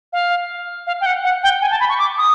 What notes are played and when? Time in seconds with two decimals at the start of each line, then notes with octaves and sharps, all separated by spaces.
0.13 F5
0.87 F5
1.01 G5
1.06 F#5
1.24 F#5
1.43 G5
1.61 G#5
1.71 A5
1.80 B5
1.89 C#6
1.99 D6
2.18 D#6